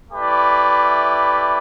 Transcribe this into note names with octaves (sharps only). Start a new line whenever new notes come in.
A3 E4 G4 B4 D5